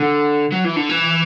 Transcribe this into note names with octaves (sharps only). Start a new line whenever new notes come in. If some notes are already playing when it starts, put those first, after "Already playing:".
Already playing: D3
F#3
E3
D3
E3